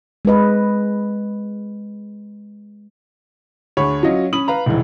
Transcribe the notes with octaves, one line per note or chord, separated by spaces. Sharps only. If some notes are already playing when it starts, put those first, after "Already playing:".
G#3 C4 B4 D#5
D2 G#4 C#5 B5
F#3 C#4 F4 D#5
C#4 B5 D#6 F#7
B4 F5 A#5
E1 C2 D#3 E3